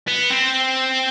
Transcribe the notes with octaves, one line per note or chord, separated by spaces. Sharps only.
B3
C4